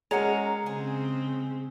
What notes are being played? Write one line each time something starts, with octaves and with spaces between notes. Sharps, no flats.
G#3 C#4 F#4 A#4 A#5 C#7
C#3 C4 G#4